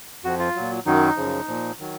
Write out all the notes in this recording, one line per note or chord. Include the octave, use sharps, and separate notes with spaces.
F2 F3 F#4
F4
A#2 F#3
F#2 D#3 F#3 D#4
F#2 C#3 F3
A#2 F3
D#3 F#3